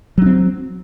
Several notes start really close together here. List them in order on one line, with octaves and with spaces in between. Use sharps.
F#3 D4 C4